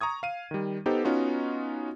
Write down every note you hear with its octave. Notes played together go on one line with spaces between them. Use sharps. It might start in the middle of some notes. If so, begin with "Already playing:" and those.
A#5 C#6 D#6 G#6
F5 D#7
D#3 G3
B3 D#4 G4 A4 C5
B3 C#4 D#4 F4 F#4